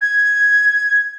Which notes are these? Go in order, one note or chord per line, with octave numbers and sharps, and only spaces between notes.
G#6